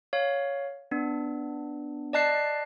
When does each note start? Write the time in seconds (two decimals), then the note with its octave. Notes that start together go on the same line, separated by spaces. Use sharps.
0.13 C#5 F5
0.91 B3 D4
2.13 D5 D#5 A5 F#6 C7